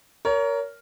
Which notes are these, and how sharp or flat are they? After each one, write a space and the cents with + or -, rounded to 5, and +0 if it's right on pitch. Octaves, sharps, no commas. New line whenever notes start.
A#4 +0 C#5 +30